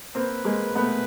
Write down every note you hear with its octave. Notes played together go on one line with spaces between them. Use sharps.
A#3 C4 B4
G#3 A#3
A3 B3 B4